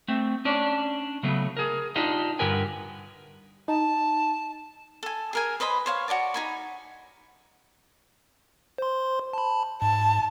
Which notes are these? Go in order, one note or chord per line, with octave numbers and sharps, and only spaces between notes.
A3 C4
C#4 D4 D5
C#3 F#3 A3 B3
G#4 A#4
D4 D#4 F4 G4 D#5
G2 D3 G4 A#4 B4 G#5
D#4 A5
A4 G#5
G#4 A#4 G#5
B4 C5 D#5 B5
C5 C#5 F5
F#4 C#5 D5 A5
D#4 G#5 B5
C5 C6
A5 B5
G#2 A5